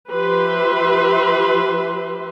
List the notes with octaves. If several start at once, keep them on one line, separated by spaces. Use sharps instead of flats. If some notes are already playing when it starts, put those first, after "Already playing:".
F3 G4 B4 E5 C6